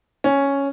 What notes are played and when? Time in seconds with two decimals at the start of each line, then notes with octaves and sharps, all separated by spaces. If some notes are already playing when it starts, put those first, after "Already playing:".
0.24 C#4